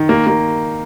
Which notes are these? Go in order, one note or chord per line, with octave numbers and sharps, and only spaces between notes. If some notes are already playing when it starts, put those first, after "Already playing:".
Already playing: D#3
A#3
A#3